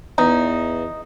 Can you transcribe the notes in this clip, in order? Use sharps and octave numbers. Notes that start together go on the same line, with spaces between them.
E2 D#4